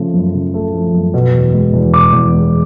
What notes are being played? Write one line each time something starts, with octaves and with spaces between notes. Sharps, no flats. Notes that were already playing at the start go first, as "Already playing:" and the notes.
Already playing: C#3 F3 A3
F#2
C#3
A3
F3
F#2
B2
E2
G#3
E2
B2 D6
E2
G#3